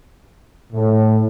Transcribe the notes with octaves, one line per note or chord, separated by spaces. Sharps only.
A2